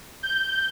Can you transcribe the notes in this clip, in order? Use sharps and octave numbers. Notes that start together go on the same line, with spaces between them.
G6